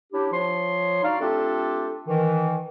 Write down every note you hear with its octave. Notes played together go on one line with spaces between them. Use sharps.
C#4 D4 E4 G4
F3 C#5 C6
D4 D#4 F#4 D5 F5
A3 C4 D4 F4 G4 A4
D#3 E3